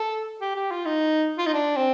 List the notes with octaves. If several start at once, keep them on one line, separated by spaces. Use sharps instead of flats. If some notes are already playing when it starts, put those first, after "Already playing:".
Already playing: A4
G4
G4
F4
D#4
F4
D#4
D4
C4